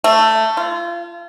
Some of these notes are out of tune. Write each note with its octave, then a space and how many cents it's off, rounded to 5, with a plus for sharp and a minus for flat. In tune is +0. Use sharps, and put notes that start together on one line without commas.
A3 +10
F4 -30